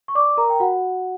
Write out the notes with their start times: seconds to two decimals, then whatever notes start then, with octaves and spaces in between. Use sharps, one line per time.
0.08 C#6
0.15 D5 D6
0.37 A#4 A#5
0.50 G5
0.60 F#4 F#5